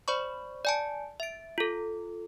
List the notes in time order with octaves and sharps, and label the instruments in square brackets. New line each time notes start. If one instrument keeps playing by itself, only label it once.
[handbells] C5 D5 B5 C#6
D5 G#5 A5
E5 D7
F4 A4